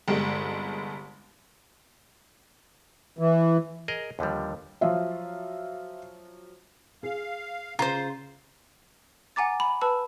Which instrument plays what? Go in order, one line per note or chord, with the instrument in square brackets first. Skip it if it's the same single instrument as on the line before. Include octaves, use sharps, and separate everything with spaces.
[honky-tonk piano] G1 C2 G#3
[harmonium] E3
[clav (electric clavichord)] G#4 A#4 D#5
D#2 D3 F3 G3
[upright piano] F3 F#3 F4 [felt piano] E5 F5
[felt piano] G#4 [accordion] F5
[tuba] C#3 [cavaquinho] F4 C5 [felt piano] A#5
[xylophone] F#5 G#5 A#5 D6 A6
B5
B4 A5 B5 E6